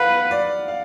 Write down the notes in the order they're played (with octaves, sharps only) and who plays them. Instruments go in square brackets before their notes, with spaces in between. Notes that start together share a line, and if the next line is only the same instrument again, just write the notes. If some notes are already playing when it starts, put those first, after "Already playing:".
Already playing: [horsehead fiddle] B4 [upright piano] F5 F#5
[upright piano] D5
F5